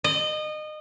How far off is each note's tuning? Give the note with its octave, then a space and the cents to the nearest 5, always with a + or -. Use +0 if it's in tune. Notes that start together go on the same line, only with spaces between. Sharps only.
D#5 -25